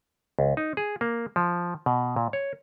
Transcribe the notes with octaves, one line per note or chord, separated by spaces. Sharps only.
C#2
D#4
G#4
A#3
F3
B2
A#2
C#5